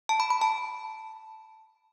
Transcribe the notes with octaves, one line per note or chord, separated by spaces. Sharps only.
A5
B5
B5
A5